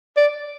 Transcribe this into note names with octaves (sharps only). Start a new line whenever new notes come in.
D5